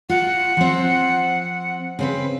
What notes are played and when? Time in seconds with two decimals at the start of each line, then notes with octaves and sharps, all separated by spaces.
0.09 F4 F#5
0.57 F3 C4
1.99 C#3 C4 B4